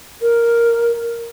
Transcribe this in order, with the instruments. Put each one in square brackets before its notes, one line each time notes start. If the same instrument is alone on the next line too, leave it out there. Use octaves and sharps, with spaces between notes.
[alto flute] A#4